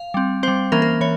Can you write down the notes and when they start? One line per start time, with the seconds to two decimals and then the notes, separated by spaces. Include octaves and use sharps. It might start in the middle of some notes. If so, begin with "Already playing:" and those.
Already playing: F5
0.14 G3 C4
0.43 G3 C4 C5
0.72 E3 A#3 C#4 A#4
0.82 A#4
1.01 E3 C#5